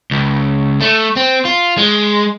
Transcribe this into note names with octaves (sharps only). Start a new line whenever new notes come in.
C#2
A3
C4
F4
G#3